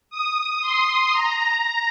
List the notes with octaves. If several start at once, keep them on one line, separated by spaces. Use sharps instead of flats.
D#6
C6
A#5